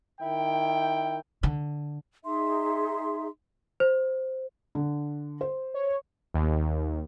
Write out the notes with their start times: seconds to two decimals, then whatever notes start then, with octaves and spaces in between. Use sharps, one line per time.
0.20 D#3 E4 G5
1.43 D3
2.24 D#4 G#4 E5 C6
3.80 C5
4.75 D3
5.41 C5
5.74 C#5
6.34 D#2